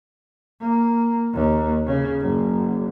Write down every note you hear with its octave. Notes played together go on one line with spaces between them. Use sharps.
A#3
D#2
C#3
F#1